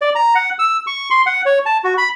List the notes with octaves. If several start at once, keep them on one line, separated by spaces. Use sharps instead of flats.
D5
A#5
F#5
E6
C#6
C6
F#5
C#5
A5
F#4
B5